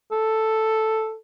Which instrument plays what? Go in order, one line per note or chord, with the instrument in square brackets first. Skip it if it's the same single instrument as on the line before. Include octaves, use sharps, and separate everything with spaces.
[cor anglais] A4